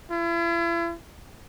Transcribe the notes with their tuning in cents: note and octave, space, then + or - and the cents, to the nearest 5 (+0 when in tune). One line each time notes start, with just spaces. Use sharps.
E4 +40